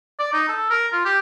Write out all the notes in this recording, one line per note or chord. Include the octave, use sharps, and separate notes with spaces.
D5
D#4
A4
A#4
F4
G4